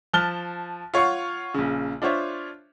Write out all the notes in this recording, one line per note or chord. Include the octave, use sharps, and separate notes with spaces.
F3 A5 F6 F#6 A6 G7
F4 C#5 F5 F#5 C#6
A#1 C#3
D4 F4 C5 C#5 E5